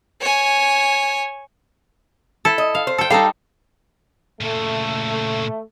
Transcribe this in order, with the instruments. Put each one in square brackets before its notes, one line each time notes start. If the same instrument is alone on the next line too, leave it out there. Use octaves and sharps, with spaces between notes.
[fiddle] C#5 G#5
[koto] E4 A4
[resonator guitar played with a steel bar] D#5
[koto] F5
[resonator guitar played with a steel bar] C5
[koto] A4 G5
[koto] G3 D#4 [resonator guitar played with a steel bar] A4 F5
[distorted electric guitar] A#2 C#3 [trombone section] A3